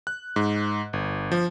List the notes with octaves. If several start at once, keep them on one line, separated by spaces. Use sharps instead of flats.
F#6
G#2
G1
F3